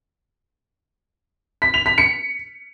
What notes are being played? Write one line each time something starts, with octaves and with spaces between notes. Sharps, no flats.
B6
F7
B6
C#7